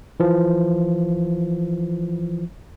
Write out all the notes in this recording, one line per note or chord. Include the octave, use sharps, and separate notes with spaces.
E3 F3